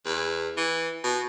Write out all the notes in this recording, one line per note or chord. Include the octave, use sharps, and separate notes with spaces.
E2
E3
B2